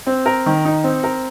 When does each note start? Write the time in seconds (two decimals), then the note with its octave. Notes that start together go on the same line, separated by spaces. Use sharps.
0.06 C4
0.26 A#4
0.46 D#3
0.65 D#4
0.84 C4
1.04 A#4